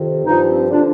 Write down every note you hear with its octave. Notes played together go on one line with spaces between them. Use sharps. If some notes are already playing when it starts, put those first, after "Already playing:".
Already playing: F2 C3 D#3
G2 F3 D#4
C4
D3 F3 D4